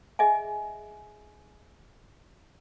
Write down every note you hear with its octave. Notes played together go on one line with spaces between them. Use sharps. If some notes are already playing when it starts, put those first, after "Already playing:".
G#4 D#5 E5 G#5